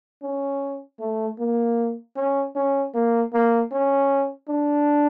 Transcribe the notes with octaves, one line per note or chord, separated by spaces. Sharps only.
C#4
A3
A#3
C#4
C#4
A#3
A#3
C#4
D4